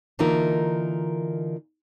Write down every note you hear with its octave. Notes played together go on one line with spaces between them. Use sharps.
D3 E3 A#3 D#4 F4 A#4